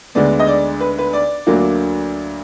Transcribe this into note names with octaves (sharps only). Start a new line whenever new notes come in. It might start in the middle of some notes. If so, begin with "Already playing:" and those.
D2 D3 G#3 B3 D5
D#5
D5
B4
B4
D5
D2 D3 F#3 A#3 D4